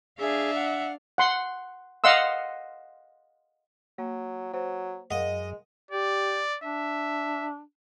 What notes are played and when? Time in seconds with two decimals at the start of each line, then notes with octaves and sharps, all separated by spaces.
0.19 D4 G#4 E5 F5
0.55 F#5
1.18 F#5 C6
2.04 D#5 F5 F#5 C6 E6
3.98 F#3 A#3
4.54 F#3 C5
5.11 F#2 G#3 A#4 D#5 F5 F#5
5.91 G4 D5
6.64 D4 E5